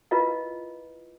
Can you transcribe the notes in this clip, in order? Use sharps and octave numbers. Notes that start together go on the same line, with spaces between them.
E4 F4 A#4 B4 D#5 F5